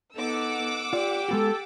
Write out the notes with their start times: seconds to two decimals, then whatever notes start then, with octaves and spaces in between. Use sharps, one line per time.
0.16 B3 D#4 A4 F#5 D6 E6
0.93 F4 G4 D5
1.29 G#3 B3 F#4 A4